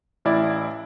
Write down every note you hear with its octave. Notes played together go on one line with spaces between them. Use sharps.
A1 E4 D5